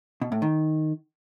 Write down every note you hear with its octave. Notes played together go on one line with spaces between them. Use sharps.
B2
A2
D#3